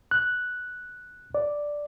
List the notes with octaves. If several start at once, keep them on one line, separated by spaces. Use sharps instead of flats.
F#6
D5